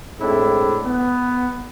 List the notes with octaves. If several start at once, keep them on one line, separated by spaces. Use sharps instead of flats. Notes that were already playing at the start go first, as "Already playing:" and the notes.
A2 G#3 C4 D4 E4
B3